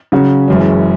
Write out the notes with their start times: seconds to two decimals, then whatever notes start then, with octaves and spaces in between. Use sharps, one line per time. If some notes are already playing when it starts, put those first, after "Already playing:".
0.12 C#3 F#3 C#4 F#4
0.48 F#1 F#2 E3 G#3 C#4